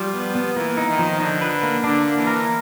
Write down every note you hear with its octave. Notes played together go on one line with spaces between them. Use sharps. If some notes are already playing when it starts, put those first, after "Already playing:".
Already playing: F3 G3
B3
B3
E3 A#3
D#4
D#3
F3
D3 D#4
B4
A#3
D3 D4
A#3
E3
A#4